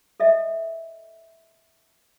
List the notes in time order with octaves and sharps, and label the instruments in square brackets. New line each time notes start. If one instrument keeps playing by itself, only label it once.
[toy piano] A4 D#5 E5